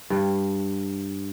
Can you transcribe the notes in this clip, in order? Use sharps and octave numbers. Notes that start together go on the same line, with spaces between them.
G2